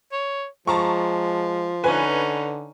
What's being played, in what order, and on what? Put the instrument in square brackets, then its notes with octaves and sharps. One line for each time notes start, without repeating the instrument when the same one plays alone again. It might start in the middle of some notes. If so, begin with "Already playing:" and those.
[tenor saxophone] C#5
[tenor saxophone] F3 [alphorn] G#3 [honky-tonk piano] A5 A#5 C#6
[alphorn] D3 [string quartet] C#4 D#4 [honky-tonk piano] B4 G#5